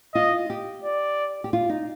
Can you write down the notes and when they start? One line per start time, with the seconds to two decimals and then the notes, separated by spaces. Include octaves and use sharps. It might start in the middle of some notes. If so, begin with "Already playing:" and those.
0.14 F4 D#5
0.50 G4
0.84 D5
1.44 G4
1.53 F4
1.69 D#4